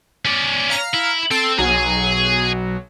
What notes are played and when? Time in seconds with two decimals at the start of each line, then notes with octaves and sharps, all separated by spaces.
0.25 C#4 D5
0.70 F5 A#5 F6
0.94 E4
1.31 C4 A4
1.58 B1 F#3 G#4